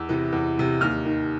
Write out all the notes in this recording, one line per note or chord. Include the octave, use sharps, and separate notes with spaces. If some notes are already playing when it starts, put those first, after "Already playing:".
Already playing: E2 E6
C3 E3
E2
C3 E3
D#2 F6
D#3